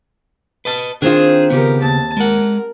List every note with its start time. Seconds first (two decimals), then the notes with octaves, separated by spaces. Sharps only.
0.65 B4 D#5 A5
1.02 D#3 C4 D4 F4 G#4 C5
1.50 C#3 B3 G4 A#4
1.82 D#2 A5
2.17 G#3 A#4 F#5